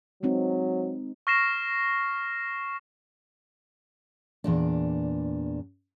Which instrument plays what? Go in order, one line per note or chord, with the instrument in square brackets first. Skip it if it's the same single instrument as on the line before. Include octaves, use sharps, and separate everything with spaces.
[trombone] F#3 [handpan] G#3 C4 D#4
[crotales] C#6 F6 A#6 C7 E7
[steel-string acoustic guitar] E2 A#2 D4